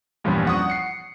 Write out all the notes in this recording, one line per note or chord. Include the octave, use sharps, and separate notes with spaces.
E2 G2 A#2 F3 G3 C#4
F#5 C#6 D#6
C7 C#7